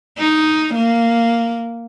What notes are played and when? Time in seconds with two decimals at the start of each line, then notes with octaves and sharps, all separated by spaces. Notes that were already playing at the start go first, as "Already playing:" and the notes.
0.18 D#4
0.74 A#3